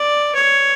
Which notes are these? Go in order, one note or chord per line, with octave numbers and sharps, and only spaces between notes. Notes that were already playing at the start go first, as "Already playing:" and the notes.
Already playing: D5
C#5